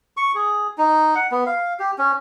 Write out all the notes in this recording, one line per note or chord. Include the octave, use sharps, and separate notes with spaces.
C#6
G#4
D#4
F#5
B3
F5
G4
C#4